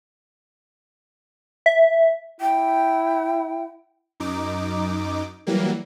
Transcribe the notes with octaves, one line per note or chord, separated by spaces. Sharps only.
E5
E4 G5
F#2 D#4 D6
E3 F#3 G3 A#3